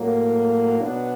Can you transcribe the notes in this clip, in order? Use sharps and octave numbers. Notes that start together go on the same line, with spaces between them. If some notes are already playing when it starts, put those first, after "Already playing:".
Already playing: A2 F#3 A#3
B2 F#3 B3 D4